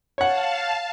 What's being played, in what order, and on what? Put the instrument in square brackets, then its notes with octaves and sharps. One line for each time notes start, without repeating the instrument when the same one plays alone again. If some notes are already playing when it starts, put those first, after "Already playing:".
[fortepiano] C#5 F#5 [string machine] F5 A5